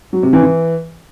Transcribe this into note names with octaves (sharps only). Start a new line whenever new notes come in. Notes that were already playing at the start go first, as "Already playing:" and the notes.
F#3
C3
E3
E3